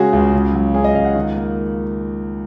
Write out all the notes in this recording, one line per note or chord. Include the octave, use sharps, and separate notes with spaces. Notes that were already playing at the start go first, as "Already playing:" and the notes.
Already playing: C#3 G#3 C#4 F#4 G#4
C#2
C#3
F#3
C#4 G#4
D#5
C#2 F5
F#5
D#3
A#3